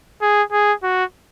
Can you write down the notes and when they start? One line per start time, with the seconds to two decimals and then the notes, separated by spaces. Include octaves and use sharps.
0.21 G#4
0.52 G#4
0.83 F#4